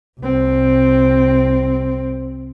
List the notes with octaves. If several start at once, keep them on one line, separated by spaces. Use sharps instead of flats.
C2 C4